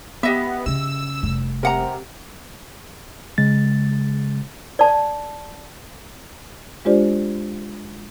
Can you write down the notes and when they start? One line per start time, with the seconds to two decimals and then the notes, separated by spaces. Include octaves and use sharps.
0.23 B3 G4 D#5 E5
0.66 C#3 C#4 E6
1.23 F1 G3
1.63 C3 A#4 F#5 A#5
3.38 C#3 G#3 A6
4.79 D5 A5
6.85 G#3 D4 F4 G4 C5 D5